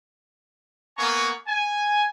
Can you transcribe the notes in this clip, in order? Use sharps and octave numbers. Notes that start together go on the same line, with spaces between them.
A#3 B3 G#5 A#5 C#6
G#5